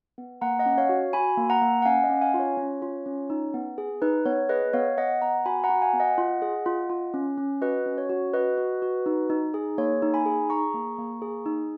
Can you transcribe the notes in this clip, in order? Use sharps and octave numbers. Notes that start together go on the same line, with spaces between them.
B3
A#3 F#5 A#5
D#5 F#5
C#4
C#5 F5
F#4
F#4 G#5 B5
A#3
F#5 A#5
A#3
F#5
C#4 F5 G#5
D#5 F#5
C#4
F5 G#5
F4
C#5
C#4
F4
C#4
D#4
B3
G#4
D#4 B4
B3 C#5
G#4 B4 D#5
B3 C#5 F5
B3 D#5 F#5
B3 F#5 A#5
F#4 G#5 B5
F#5 A#5
F#4
F5 G#5
B3
D#5 F#5
F4
G#4
F4
F4
C#4
C#4
F#4 B4 D#5
C#4
C#5
F#4
F#4 B4 D#5
F#4
F#4
D#4
D#4
G#4
A#3 C#5
D#4
G#5 B5
G#4
G#4 A#5 C#6
A#3
A#3
G#4
D#4